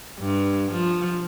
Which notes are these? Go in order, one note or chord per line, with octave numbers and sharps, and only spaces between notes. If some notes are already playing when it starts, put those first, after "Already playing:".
G2
F3